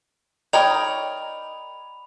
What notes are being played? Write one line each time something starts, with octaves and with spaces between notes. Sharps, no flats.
D#4 A#4 C#5 D5 G5 B5 D#6 F7